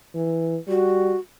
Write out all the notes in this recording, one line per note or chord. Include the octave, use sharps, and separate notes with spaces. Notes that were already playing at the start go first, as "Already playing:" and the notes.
E3
G3 F#4